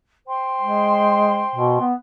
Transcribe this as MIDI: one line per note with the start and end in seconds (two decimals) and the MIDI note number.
0.27 1.84 72
0.27 1.84 79
0.27 1.84 84
0.61 1.42 56
1.56 1.80 47
1.80 1.94 59